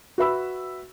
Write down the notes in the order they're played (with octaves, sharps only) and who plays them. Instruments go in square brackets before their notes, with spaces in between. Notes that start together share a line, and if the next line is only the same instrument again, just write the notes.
[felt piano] F#4 B4 E5 B5 E6